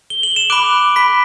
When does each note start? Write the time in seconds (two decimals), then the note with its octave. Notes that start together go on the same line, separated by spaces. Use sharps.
0.10 G7
0.23 F#7
0.36 E7
0.50 B5 D6 F#6 D7
0.96 B5 B6